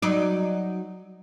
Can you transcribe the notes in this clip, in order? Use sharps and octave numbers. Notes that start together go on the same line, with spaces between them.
F#3 D#4 D5